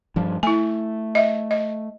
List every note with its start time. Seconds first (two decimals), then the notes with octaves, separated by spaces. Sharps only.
0.16 G2 F3
0.43 A3 E4 G#5
1.15 D#5 E5
1.51 D#5